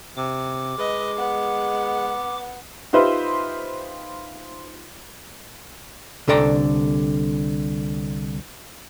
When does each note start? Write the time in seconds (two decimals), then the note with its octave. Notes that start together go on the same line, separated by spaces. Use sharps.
0.17 C3 D6
0.78 G#3 B4 D#5
1.17 B3 F#5
2.93 D#4 F4 G4 B4 C5 E5
6.28 C2 D3 A4 D5 A#5